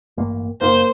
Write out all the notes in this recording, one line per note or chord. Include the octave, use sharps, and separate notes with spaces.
A1 G2 A#3
F#1 A#3 C5